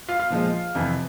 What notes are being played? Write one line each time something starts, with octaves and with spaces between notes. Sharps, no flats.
F4 F5
F4 F5
A#2 F3 G#3
F2 C3 E3